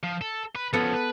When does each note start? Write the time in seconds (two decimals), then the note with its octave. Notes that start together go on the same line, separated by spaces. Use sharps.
0.04 F3
0.21 A4
0.56 B4
0.73 F3 B3 C#4 A4 F#5
0.94 B4